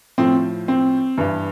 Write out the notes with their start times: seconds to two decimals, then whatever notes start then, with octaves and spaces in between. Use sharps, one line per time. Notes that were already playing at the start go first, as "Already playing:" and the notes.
0.18 A2 F3 C4
0.68 C4
1.18 G2 E3